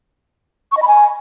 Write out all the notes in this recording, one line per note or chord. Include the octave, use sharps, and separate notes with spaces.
C#6
D#5
B5
G#5